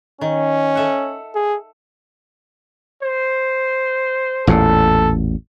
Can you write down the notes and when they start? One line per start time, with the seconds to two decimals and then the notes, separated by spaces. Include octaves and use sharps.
0.21 D#3 C#4
0.75 A4 E5 F#5
1.35 G#4
3.03 C5
4.47 A1 E2 A#2 A4